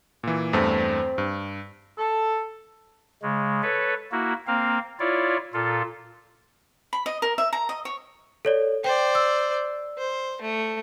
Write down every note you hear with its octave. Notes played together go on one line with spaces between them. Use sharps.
A#2 E3
E2 G2 A3 C4
G2
A4
C#3 G#3
A4 B4 C#5
A#3 E4 F#4
A#3 C4 F5
E4 F4 C#5 D5
A#2 F4 A4
B5
D#5
A#4
E5
A#5
D#5
C#5
A4 C#5 D5
C5 D5 G5
E6
C5
A3